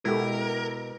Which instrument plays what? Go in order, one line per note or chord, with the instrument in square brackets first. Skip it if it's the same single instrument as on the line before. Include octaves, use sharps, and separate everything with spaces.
[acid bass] B2 [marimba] G#3 A4 [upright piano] E4 G4 [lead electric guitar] A#4